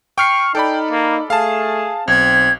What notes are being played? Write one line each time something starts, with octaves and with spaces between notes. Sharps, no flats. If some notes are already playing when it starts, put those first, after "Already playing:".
G5 C#6 F6 C7
D#4 A4 D5 G5 B5
A#3
A3 G#4 F5 A5
B1 C4 G#6